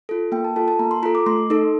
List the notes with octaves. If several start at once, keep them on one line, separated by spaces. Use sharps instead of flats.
F4 A4
A#3 G5
A5
F4 A4 A5
A5
A#3 A#5
C6
F4 A4 A#5
D6
A3 C6
D#4 A4